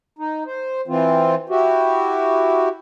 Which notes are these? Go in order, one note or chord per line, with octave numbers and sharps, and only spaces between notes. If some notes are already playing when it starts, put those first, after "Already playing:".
D#4
C5
E3 C4 F4
E4 F#4 G4